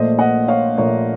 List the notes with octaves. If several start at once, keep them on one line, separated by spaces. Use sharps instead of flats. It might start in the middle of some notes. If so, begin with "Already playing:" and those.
Already playing: A#1 A#2 A3 C5 D#5
D#5 F#5
C#5 F5
A#1 A#2 A3 A#4 C#5